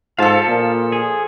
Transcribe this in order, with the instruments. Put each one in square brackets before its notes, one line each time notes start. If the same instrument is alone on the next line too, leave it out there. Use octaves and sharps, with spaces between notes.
[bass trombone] G#2 [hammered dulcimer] F3 A4 [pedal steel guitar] F5 A5
[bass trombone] A#2
[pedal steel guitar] G#4